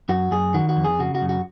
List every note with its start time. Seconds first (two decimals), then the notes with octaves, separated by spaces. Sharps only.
0.09 F#2 F#4
0.31 F#2 G#4
0.54 D#3 F#4
0.69 F#4
0.77 F2
0.85 G#4
0.99 C#3 F#4
1.15 F#4
1.22 F#2
1.29 F#4